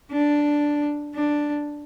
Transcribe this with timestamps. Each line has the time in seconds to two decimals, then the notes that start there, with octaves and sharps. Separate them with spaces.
0.12 D4
1.15 D4